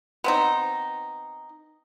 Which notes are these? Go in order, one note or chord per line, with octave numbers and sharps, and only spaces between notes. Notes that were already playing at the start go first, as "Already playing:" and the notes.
B3 C4 D#4